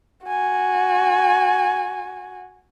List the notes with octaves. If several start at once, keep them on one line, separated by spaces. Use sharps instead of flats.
F#4 G#5